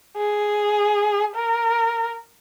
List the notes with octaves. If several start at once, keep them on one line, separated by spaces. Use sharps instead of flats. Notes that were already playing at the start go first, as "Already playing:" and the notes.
G#4
A#4